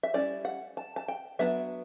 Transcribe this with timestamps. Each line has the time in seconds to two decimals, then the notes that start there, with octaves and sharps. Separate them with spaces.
0.03 E5
0.14 G3 C#4 E4 D5
0.45 F#5
0.77 A5
0.96 A5
1.08 G5
1.39 F#3 B3 D4 E5